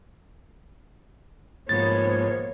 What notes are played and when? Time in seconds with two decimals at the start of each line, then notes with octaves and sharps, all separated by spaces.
1.69 G#2 B2 F3 A#3 B3 C5 C#5 A6